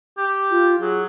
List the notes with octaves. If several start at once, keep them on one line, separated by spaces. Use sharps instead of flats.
G4
F4
F#3 G#4